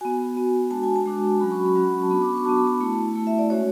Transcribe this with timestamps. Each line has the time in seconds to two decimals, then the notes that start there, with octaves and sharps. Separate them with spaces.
0.01 B3 F#4 G#5
0.36 B3 F#4
0.71 G#3 D4 F#4 A5
0.83 G#5
0.96 A5
1.06 G#3 D4 F#4
1.41 F#3 C#4 F#4 B5
1.52 C#6
1.63 B5
1.75 F#3 C#4 F#4
2.02 A5
2.11 B3 D4 F#4 B5
2.22 D6
2.34 C#6
2.45 B3 D4 F#4 A5
2.56 B5
2.67 A5
2.80 A3 E4
3.15 A3 E4
3.27 E5
3.38 D5
3.50 G#3 C#4 F#4 C#5